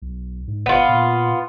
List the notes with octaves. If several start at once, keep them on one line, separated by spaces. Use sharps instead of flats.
B1
G#2
G#1 B3 F4
A#2